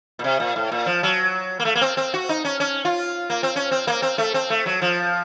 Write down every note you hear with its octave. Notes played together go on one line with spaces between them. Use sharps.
A#2
C3
A#2
A2
A#2
F3
F#3
A#3
A3
A#3
C4
C4
F#4
D#4
C#4
C#4
F4
A#3
C4
C#4
C4
A#3
C4
A3
C4
A3
F#3
F3